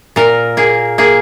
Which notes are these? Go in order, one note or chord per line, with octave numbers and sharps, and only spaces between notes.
A#2 A#4
A#3 G#4
A#3 G#4